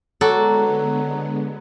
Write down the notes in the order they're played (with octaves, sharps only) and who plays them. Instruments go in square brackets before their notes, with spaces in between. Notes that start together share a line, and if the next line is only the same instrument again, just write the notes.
[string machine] D3 G#3 B3 [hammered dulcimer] F#3 [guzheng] F#4 A4 D5